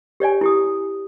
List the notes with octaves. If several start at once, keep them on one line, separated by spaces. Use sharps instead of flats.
G4 C#5 D5 G#5
E4 G4 D#6